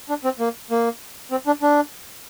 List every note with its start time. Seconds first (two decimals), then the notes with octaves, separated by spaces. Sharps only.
0.09 D4
0.24 C4
0.39 A#3
0.70 A#3
1.31 C4
1.47 D4
1.62 D4